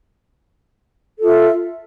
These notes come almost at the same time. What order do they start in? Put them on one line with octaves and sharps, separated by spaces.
A4 F4 E5